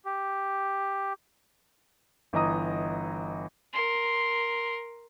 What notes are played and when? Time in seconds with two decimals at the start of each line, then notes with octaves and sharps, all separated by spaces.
0.05 G4
2.33 G1 E3 D#5 A#5 D#6
3.73 A#4 C6